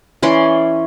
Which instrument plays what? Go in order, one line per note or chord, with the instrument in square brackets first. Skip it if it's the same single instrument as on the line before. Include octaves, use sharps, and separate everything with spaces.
[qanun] E3 C#4 D5 C6